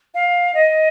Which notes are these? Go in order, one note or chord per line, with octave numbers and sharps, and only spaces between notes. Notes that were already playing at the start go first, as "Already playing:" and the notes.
F5
D#5